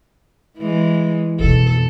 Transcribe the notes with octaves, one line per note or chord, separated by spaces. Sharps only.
E3 G#3
F2 B2 A4